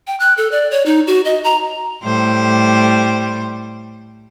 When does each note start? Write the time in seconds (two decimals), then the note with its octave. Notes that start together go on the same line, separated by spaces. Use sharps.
0.07 G5
0.20 F#6
0.38 A4
0.51 D5
0.71 C#5
0.86 D#4
1.07 F#4
1.25 D#5
1.44 A#5
2.03 A2 G3 C5